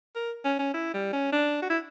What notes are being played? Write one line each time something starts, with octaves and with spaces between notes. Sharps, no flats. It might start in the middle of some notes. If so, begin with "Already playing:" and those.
A#4
C#4
C#4
E4
G3
C#4
D4
F#4
E4